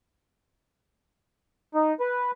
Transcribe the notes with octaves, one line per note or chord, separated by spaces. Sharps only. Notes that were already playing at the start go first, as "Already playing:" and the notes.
D#4
B4